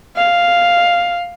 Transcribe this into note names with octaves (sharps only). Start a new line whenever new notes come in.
F5